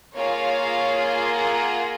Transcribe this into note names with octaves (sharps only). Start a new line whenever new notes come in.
A#3 F4 G#4 C#5 F5
F#5 A#5